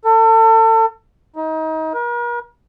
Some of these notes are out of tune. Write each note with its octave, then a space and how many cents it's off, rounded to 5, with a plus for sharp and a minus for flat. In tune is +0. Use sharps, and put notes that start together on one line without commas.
A4 +35
D#4 +30
A#4 +45